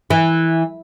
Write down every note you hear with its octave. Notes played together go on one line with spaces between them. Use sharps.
E3